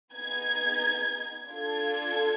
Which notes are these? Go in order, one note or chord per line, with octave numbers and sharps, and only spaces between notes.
B3 D#4 G#4 G#6
D4 F4 A4 G#6